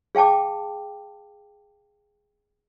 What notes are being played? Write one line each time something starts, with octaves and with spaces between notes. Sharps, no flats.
G#4 F5 G5 A5 D6